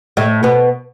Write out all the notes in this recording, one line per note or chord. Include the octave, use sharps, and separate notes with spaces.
A2 A3
B2 B3